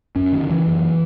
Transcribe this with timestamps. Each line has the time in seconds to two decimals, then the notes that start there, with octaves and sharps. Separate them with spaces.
0.16 F#2 C#4
0.33 D#3
0.41 C#3
0.50 E3
0.67 F#2